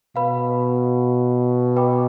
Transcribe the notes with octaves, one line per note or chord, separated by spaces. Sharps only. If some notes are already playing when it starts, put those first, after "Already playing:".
B2 B4 F5 B5
B4 D#5 G5 B5 D6